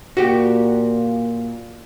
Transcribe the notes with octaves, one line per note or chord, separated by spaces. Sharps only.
A#2 F#4 G4